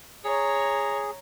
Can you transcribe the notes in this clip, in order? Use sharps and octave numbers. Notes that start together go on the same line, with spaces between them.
G#4 C#5 A#5